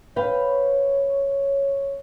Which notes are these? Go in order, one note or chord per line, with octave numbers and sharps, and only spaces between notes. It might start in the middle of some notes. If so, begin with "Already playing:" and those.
B4 C#5 F5 G5